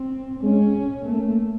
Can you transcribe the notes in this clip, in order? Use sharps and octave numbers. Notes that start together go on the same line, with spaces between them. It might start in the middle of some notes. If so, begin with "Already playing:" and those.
Already playing: C4
G#3 C#4
A3 A#3